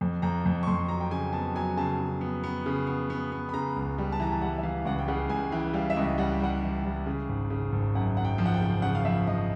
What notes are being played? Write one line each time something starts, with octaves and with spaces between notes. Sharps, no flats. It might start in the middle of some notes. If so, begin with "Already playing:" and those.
F2
F2 A#5
F2
C#6
F2 C6
F#3 A#5
G5
C#3 G#5
B3 A5
F#3 G#5
C#3 A5
C#3
B3
B3
C#3
B3
B3
B3
B5
C#3 A#5
C#2
G3
A5
E3 A#5
A5
G3 F#5
E5
E3 F5
C#2 F#5
G5
C#3 F#5
C#2 G#5
E3 G5
G3 F5
E5
C#2 D#5
G3 F#5
G5
G3 F#5
E3
G3
C#3
G#1
C#3
G#1
F#2 F#5
F#2 F#5
G5
F3
F#5
G5
C#3
C#3 F#5
F5
F3 E5
F3 D#5